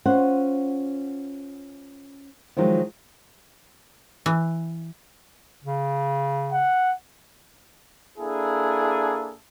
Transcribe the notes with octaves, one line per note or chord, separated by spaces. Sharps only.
C#4 F4 C5 F#5
D#3 F3 F#3 G#3 D#4 F4
E3
C#3
F#5
A#3 D4 E4 G#4 A4